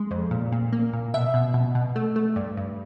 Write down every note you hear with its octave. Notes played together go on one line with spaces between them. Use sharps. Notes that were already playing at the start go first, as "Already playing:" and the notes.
Already playing: G#3
F2
A#2
A#2
A#3
A#2
B2 E5
B2
B2
B2
A3
A3
G2
G2